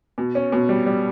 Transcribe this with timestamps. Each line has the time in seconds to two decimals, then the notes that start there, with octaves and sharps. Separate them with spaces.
0.18 B2
0.35 C#4
0.52 B2
0.69 G3
0.86 G3